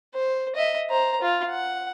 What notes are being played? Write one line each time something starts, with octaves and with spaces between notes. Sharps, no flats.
C5
D#5 E5
C5 A#5
F4
F#5